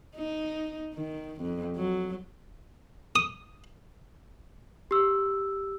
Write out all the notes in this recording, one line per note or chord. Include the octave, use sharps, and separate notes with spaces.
D#4
D#3
F2
F#3
D#6
G4 E6